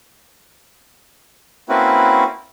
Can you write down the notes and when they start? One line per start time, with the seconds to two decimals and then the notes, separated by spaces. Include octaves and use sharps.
1.69 A#3 C4 C#4 E4 F#4 B4